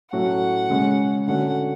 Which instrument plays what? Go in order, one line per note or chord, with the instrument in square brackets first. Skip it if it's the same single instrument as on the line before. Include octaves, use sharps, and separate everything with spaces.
[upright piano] A2 F#3 A3 C#4 F#4 [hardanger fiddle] F#5
[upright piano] C#3 G#3 C#4
[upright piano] D3 A3 C#4 F#4 [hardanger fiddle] F#5